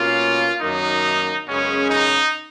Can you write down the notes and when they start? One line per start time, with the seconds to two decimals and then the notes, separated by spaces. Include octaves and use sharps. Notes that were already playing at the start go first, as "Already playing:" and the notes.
Already playing: B2 A#3 C#4 F4
0.61 F#2 D#3 F#3 A#3 D#4
1.47 F#2 C#3 G#3 B3 C#4
1.90 D#4